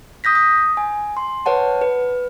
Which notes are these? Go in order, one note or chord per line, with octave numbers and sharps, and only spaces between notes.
D#6 G6 A#6 B6
D#6
G#5
C6
B4 C#5 F#5 A5
B4